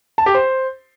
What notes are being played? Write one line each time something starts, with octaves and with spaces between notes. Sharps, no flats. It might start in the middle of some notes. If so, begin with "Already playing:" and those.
A5
G4
C5